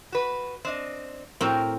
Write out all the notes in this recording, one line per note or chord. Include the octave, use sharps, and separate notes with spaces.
F#4 B4
C4 D4 D#5
A2 C4 F#4 A#4 A#5